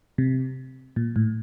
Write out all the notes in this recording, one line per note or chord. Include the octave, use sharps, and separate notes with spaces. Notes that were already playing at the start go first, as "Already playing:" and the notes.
C3
A#2
A2